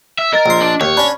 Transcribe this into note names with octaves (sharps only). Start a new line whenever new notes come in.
E5
A#4 D#5 A6
A#1 C6
D4
D#2 C#5
C#4 D4 B5